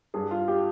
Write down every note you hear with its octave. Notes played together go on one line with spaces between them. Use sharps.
G2 G#4
F4
G4